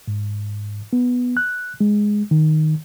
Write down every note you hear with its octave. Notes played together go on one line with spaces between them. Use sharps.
G#2
B3
F#6
G#3
D#3